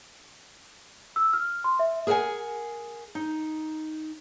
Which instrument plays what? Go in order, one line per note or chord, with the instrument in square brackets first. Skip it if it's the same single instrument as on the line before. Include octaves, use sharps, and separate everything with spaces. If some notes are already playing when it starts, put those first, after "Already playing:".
[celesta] E6
F6
C6
E5
[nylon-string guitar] G#4 A#4 B4 E5 F#5 G#5
D#4